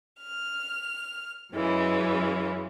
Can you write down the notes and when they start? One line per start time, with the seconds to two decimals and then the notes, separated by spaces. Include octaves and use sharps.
0.20 F6
1.53 F#2 C#3 E3 G#3